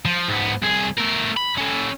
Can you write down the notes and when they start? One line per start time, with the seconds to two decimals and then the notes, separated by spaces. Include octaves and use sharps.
0.05 F3
0.28 G#2 B3
0.62 C2 G#4
0.98 A3 A#4
1.37 B5
1.58 C#4 A4